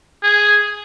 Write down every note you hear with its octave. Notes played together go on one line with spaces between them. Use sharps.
G#4